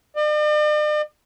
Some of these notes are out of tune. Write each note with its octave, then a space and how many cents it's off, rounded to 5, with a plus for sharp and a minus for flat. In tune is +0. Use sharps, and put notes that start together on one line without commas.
D5 +45